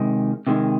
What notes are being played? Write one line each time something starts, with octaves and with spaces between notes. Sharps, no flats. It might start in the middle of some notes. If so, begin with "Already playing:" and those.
Already playing: C3 D#3 G#3
C3 D#3 G#3